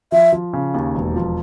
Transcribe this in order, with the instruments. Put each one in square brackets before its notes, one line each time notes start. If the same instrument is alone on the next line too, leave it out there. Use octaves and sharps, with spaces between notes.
[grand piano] F3 [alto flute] E5
[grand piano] F3
C#3
D#2
E1
F3